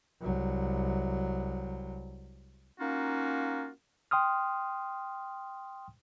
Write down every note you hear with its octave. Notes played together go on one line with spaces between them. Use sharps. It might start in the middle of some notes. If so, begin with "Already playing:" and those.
C2 F#3
A#3 C#4 D#4 F4 F#4
G5 C6 D#6 F6